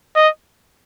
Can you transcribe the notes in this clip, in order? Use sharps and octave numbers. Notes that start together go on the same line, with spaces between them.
D#5